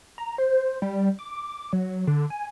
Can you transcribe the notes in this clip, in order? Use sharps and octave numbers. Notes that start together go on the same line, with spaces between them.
A#5
C5
G3
D6
F#3
D3
G#5